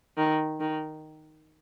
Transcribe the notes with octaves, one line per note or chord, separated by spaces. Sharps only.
D#3
D#3